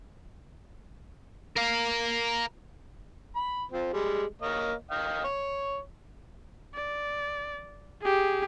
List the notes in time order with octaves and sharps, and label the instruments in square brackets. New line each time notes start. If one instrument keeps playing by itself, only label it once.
[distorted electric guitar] A#4 F5
[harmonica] B5
F3 C4
G3 G#3
A#3 C#5 D#5
D#5 F5 G5
C#5
[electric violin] D5
G4 G#4